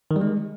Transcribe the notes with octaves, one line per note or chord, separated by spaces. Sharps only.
D#3
G3
G#3